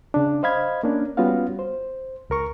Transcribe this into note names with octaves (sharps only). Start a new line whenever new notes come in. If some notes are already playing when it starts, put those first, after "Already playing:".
C#3 D4
C5 D#5 F5 B5 G#6
A#3 C#4 D4
G3 B3 C#4 F4 F#4 F5
C5
C#2 A#4 C#6